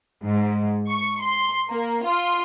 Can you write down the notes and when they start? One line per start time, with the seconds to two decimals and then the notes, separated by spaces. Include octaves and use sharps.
0.24 G#2
0.89 C#6
1.23 C6
1.70 A#3
2.07 F4